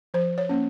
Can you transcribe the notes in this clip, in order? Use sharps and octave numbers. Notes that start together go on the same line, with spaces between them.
F3 C5
C#5
A#3 C#4